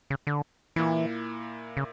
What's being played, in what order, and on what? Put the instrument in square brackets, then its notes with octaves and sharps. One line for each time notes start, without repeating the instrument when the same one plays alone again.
[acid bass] C#3
D3
[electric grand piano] A#2 A#3 E4 [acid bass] E3
[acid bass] C#3